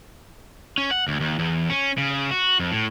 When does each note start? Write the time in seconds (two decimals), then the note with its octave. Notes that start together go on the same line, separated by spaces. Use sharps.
0.78 C#4
0.91 F#5
1.08 D2
1.20 D#2
1.39 E2
1.70 C#4
1.98 C#3
2.31 F#4
2.59 F2
2.72 A2